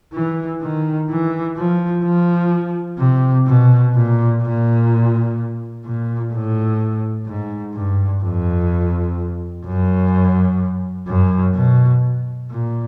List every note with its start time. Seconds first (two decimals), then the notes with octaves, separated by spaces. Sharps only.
0.13 E3
0.62 D#3
1.09 E3
1.57 F3
2.04 F3
2.99 C3
3.47 B2
3.95 A#2
4.42 A#2
5.85 A#2
6.33 A2
7.26 G#2
7.74 G2
8.22 F2
9.65 F#2
11.08 F#2
11.55 B2
12.51 A#2